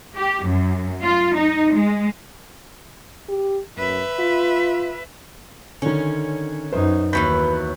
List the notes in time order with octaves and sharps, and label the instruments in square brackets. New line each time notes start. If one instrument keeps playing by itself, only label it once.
[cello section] G4
F#2
F4
D#4
G#3
[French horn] G4
[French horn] F#2 [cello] B4 E5
[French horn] F4
[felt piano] D3 D#3 [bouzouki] C#4
[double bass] F#2 D#4 [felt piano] B4 C5
[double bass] D#2 [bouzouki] E3 F#3 B3 [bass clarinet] B4 [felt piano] G6 B6